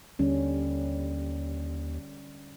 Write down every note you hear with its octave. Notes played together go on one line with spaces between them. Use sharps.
D#2 D3 G3 C#4